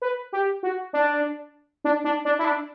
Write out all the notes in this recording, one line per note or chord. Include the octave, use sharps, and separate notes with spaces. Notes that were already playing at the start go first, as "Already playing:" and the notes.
B4
G4
F#4
D4
D4
D4
D4
E4
D4